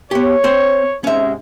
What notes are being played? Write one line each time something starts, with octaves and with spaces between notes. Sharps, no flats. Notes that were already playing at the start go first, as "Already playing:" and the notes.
B3 G4 C#5
C4 C5
G#2 C3 G#3 C#4 E5